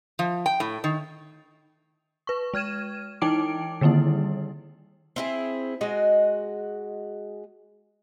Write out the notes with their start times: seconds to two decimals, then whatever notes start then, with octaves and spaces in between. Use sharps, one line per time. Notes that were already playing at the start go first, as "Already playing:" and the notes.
0.19 F3
0.46 G5
0.60 A2
0.84 D#3
2.27 B4 C#6
2.54 G#3 F6 G#6 D#7 E7
3.21 E3 D#4 E4 G5 D6 D7
3.81 D3 D#3 G3 A#3 E4
5.16 C4 E4 G#4
5.81 G#3 F#4 D#5